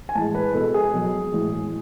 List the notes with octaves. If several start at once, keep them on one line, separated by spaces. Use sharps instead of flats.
G#5
A2 E3 G#3 A5
B4
B2 G#3 A4
G#4
B2 F#3
A2 E3 G#3